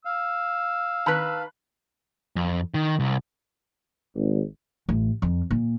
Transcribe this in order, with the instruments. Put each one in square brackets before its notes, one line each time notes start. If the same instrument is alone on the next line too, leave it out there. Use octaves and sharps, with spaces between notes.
[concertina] F5 [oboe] E6
[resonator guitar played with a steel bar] D#3 B4 [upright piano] A5 B5 F#6 [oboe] E6
[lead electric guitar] F2
D#3
C2
[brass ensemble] G#1
[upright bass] A1
F2
A#2